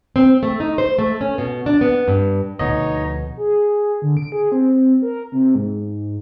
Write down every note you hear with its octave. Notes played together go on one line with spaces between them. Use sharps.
C4
A3
D#4
C5
A3
C#4
B2
D4
B3
G2
D2 B2 F3 D#4 C#5 D#5
G#4
D3
D7
G#4
C4
A#4
C3
G#2